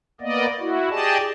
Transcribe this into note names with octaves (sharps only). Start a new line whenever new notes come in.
A#3 B3 D5 D#5
E4 F#4
G4 G#4 D5 D#5 A5